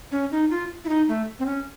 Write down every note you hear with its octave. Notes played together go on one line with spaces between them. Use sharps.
C#4
D#4
F4
E4
D#4
A3
C4
C#4